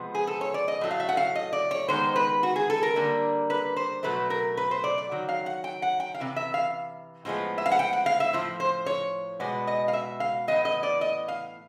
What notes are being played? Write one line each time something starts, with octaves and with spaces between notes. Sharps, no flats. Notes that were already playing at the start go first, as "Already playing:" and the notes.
Already playing: C3 F3 G#3 B3
G#4
A4
C#5
D5
D#5
A2 F#3 A3
F5
E5
F#5
F5
D#5
D5
C#5
D#3 G#3 B3 C5
B4
F#4
G#4
A4
A#4
D3 G3 A#3
B4
C5
B2 F#3 A3 B4
A#4
B4
C5
D5
D5
D#3 F#3
F5
F#5
G5
F#5
G5
F5
C3 E3
E5
F5
A2 F3 G#3 B3
E5
F5
F#5
G5
F#5
F5
E5
A2 F3
C5
C#5
B2 G#3 B3 D5
D#5
F5
E5
F5
A2 E3 G#3 B3 D#5
D#5
D5
D#5
F5